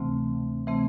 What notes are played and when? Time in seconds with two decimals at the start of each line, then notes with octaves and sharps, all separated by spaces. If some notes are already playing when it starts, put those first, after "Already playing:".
Already playing: D2 C3 E3 A3 C4
0.67 C3 E3 A3 C4